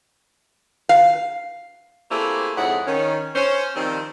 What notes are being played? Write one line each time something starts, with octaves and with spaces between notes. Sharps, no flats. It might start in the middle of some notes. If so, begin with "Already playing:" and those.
F5
A3 A#3 C4 E4 G4 G#4
F2 G#2 E4 G#4 C#5 F#5
D#3 C#4
C#4 C5
D#3 F3 G3 C4